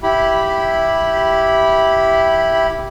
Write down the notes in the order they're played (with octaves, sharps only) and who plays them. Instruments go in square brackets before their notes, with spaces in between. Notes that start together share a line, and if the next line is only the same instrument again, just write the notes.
[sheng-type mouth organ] E4 G4 B5